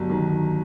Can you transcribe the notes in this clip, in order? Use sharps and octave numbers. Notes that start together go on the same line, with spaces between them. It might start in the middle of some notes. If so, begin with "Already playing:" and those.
Already playing: G1 F#3
D#3